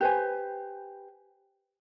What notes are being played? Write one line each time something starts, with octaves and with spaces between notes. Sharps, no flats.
G4 B4 C5 G#5